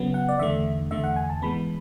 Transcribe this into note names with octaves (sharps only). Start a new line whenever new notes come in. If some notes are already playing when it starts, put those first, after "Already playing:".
Already playing: C#3 F#3 B3
F#5
D5
E2 D3 A3 E5
E2 D3 A3 E5
F#5
G#5
A5
G#2 E3 G#3 B3 B5